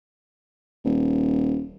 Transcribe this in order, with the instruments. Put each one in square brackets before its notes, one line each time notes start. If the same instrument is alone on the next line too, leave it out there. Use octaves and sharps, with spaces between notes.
[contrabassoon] D#1